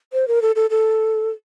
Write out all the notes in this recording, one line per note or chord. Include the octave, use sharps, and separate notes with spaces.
C5
A#4
A4
A4
A4